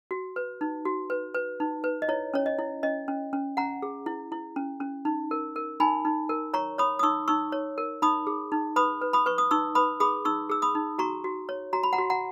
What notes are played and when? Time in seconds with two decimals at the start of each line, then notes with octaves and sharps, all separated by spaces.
0.11 F#4
0.36 B4
0.61 D#4
0.85 F#4
1.10 B4
1.34 B4
1.60 D#4
1.84 B4
2.02 D#5
2.08 E4 C#5
2.34 C#4 C#5
2.46 D#5
2.59 E4
2.83 C#4 D#5
3.08 C#4
3.33 C#4
3.57 C#4 F#5 A#5
3.82 G#4
4.06 E4
4.32 E4
4.56 C#4
4.80 C#4
5.05 D#4
5.31 A#4
5.56 A#4
5.80 D#4 G#5 B5
6.05 D#4
6.29 A#4
6.54 C#5 A#5 C#6
6.78 C#5 B5 D#6
6.99 D#6
7.03 D#4 C#6 E6
7.28 D#4 C#6 E6
7.52 C#5
7.78 A#4
8.02 D#4 B5 D#6
8.27 G#4
8.52 D#4
8.76 B4 B5 D#6
9.02 B4
9.13 B5 D#6
9.26 B4 C#6
9.38 D#6
9.51 D#4 C#6 E6
9.75 B4 B5 D#6
10.00 G#4 B5 D#6
10.25 D#4 C#6 E6
10.50 G#4 E6
10.62 B5 D#6
10.75 D#4
10.99 F#4 A#5 C#6
11.24 F#4
11.49 C#5
11.73 F#4 A#5
11.83 B5
11.93 F#5 A#5
11.98 F#4
12.10 F#5 A#5